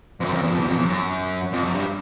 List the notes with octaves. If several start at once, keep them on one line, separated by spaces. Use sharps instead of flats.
F2
F#2
F2
E2
F2
E2
F2
E2
F#2
F2
F#2
G2